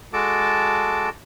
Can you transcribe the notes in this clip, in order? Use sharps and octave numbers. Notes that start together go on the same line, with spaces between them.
G#3 F#4 A4 A5 D6